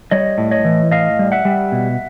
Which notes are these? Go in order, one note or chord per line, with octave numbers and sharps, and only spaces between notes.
G3 C#5 D#5
A2
C#5 D#5
E3
A2 D#5 F5
G3
E5 F#5
G3
B2